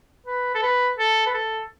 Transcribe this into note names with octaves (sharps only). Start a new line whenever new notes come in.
B4
A4
B4
A4
B4
A4